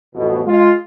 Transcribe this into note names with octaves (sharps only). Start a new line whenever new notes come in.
A1 F2 B2
G#3 F4